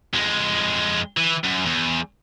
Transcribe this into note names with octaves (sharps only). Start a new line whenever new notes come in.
F2 G#3
E3
F#2
E2